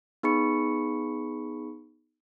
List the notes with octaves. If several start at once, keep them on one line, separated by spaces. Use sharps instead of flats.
B3 D#4 G#4 B5 C#6 C#7